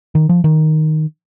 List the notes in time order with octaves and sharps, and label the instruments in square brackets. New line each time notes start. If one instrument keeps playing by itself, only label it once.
[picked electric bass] D#3
F3
D#3